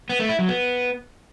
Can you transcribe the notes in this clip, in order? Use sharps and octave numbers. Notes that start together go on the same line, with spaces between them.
B3
A3
E4
F#3
B3